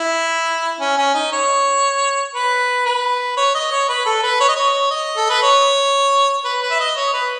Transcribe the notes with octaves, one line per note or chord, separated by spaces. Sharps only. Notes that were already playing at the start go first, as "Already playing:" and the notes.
Already playing: E4
C#4
C#4
D#4
C#5
B4
B4
C#5
D#5
C#5
B4
A4
B4
C#5
D#5
C#5
D#5
A4
B4
C#5
B4
B4
E5
D#5
C#5
B4